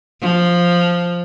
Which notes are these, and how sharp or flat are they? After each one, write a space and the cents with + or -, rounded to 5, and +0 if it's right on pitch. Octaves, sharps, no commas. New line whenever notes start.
F3 +0